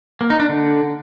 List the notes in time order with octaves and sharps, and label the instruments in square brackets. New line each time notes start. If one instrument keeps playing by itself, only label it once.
[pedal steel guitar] A#3
D#4
D4
D3